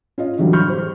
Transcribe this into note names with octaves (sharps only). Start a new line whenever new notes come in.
C#4 F4 D#5
D3 E3 F#3 G3
B5 C#6 F6 G6
G4 C5